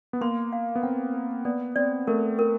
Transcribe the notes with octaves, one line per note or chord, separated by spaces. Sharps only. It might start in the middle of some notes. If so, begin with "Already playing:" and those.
B3
A#3 C6
F5
B3
C4 F#5
B4
B3 D5
C4 D5
A3 A#4
A#4